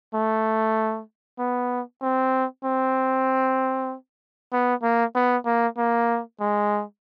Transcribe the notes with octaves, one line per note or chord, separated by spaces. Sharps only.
A3
B3
C4
C4
B3
A#3
B3
A#3
A#3
G#3